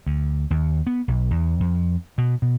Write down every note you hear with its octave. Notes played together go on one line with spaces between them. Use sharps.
D2
D#2
B3
B1
E2
F2
B2
B2